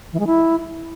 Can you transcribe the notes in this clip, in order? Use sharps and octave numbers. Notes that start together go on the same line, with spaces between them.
E3
G#3
E4